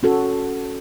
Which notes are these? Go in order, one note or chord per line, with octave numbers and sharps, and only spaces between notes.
C#4 F#4 A4